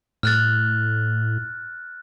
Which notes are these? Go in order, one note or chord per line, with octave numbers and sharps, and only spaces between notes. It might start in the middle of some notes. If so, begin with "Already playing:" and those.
A2 F6 F#6 A6